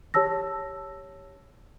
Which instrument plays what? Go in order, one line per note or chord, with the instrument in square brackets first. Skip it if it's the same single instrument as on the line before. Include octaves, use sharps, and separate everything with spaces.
[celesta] G4 C#5 A5 E6 A#6